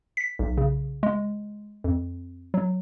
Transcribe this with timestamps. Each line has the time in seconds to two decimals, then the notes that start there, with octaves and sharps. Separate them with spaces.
0.17 B6
0.39 B1
0.57 C#3
1.03 G#3
1.84 F2
2.54 F#3